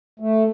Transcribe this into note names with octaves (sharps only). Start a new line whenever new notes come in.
A3